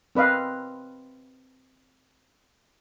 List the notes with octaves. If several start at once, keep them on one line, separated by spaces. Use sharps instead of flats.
C4 B4 D#5 F5